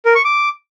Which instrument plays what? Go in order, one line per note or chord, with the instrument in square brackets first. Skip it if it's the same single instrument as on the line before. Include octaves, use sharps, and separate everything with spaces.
[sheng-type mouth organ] A#4
C#6
D6